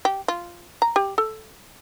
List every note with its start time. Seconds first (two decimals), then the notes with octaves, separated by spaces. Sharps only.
0.05 G4
0.28 F4
0.82 A#5
0.96 G4
1.18 A4